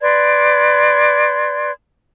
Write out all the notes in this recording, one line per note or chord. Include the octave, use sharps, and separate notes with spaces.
B4 D5 C6 G#6